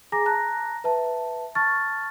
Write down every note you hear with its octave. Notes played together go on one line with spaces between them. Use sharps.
G#4 G#5 A#5 D6 A#6
A5 A#5 F#6 A#6
B4 E5 A5
A5 C#6 F6 A6